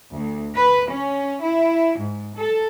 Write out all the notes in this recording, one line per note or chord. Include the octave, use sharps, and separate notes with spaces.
D2
B4
C#4
E4
G#2
A4